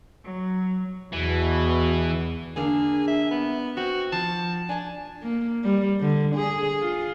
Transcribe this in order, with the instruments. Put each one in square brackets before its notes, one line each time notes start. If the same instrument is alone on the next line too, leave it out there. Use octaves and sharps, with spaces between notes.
[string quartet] F#3
[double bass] E2 [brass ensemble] B2 [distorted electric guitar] E3
[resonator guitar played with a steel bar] D3 A#3 D4 [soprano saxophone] G#4
[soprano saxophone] E5
B3
[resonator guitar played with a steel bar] C4 [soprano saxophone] F#4
[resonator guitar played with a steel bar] F3 [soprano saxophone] A5
[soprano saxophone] D4 [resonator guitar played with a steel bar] G#5 A5
[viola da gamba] A#3
G3
D3
G#4
F4